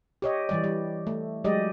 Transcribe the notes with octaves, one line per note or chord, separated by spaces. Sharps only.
G4 C#5 D#5
E3 G3 D5
G3
A3
F#3 G#3 G4 D5 D#5